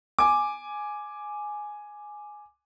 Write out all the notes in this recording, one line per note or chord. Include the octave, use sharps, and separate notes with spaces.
G#5 D6